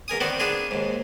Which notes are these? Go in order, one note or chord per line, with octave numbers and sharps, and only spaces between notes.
E2 A#4 G#5 D#6
D#3 B3 C4 F#4 D5
B3 D4 F4 G#4 G#5
D#2 G#2